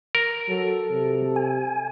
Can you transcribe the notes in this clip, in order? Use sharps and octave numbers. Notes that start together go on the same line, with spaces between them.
A#4
F#3 A4
C3
G#5